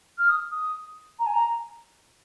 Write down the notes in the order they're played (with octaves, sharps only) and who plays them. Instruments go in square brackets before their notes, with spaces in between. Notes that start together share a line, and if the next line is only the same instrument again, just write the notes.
[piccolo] F6
D#6
D#6
A#5
G#5
A#5